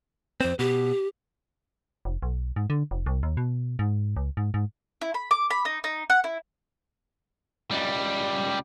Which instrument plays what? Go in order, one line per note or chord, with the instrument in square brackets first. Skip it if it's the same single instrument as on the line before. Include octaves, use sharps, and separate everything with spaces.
[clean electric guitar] F2 C4 [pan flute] C5
[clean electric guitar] B2 [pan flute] G4
[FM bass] F1
B1
G#2
D3
F1
C2
D#2
B2
G#2
C#2
G#2
G#2
[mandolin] E4
B5
D6
B5
D#4
D#4
F#5
E4
[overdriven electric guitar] C#2 G3